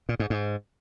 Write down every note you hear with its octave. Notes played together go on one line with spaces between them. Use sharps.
A#2
G#2
G#2